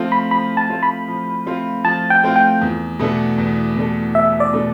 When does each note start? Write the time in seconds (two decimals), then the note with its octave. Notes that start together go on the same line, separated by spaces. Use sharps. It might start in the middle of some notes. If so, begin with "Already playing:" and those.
Already playing: F3 A3 C4 F4
0.12 B5
0.31 F3 B5
0.57 A5
0.70 A3 C4 F4
0.83 B5
1.08 F3
1.46 A3 C4 F4
1.84 F3 A5
2.10 G5
2.24 A3 C4 F4
2.36 G5
2.61 E2
2.99 B2 A3 D4 A4
3.38 E2
3.76 B2 A3 D4 A4
4.15 E2 E5
4.40 D5
4.53 B2 A3 D4 A4